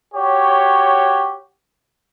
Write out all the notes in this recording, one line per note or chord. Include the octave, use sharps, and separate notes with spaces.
F#4 G4 C#5